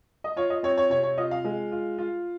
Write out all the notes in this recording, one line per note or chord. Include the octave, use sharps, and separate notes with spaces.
D#5
F4 C#5
D#5
C4 C#5
C#5
C3 C#5
C#5
F4 D#5
F5
G#3
F4
F4